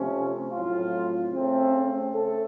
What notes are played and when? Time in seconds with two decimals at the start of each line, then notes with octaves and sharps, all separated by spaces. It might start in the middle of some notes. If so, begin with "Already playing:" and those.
Already playing: C3 F3 A3 C#4
0.51 A2 F#3 C4 F4
1.31 C#3 A3 C4
2.13 A3 C#4 A4